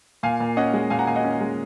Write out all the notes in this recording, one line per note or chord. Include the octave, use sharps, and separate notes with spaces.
A#2 F5 G#5
A#2
C#4 D#5 F#5
G#3
A#2 F5 G#5
F#5 A#5
A#2 F5 G#5
D#5 F#5
C#4
G#3